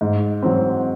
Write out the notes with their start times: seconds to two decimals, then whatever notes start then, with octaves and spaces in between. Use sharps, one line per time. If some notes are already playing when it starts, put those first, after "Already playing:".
0.01 G#2
0.42 F#3 C4